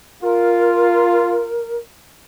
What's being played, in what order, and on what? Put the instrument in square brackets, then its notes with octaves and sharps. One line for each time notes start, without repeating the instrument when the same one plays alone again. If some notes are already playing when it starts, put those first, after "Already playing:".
[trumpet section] F4 [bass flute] A#4